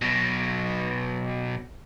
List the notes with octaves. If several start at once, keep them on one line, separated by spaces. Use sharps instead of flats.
B2 F#3